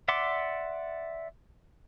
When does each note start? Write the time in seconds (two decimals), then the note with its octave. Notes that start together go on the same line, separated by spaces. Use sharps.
0.08 D5 E5 F#5 C6 D6